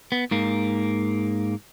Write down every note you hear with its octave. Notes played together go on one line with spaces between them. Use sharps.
B3
G#2 A#3